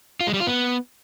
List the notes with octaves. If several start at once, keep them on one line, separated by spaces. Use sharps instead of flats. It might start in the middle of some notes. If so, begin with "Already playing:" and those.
F4
G#3
G3
F4
B3